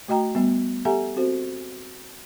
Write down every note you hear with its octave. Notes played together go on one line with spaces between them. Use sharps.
A3 F#4 D#5 G5 A#5
G3 B3
G4 A4 E5 F#5 G#5 A#5
C4 F#4 A4 C5